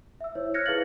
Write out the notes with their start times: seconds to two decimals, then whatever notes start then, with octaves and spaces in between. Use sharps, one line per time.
0.21 E5 E6
0.35 E4 C5 C#5
0.54 F6 F#6 G#6 A#6 C#7
0.66 E4 G#4 B4 F5 A6 F#7